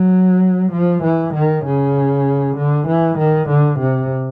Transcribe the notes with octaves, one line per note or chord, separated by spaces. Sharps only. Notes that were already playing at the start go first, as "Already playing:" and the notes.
Already playing: F#3
F3
E3
D#3
C#3
D3
E3
D#3
D3
C3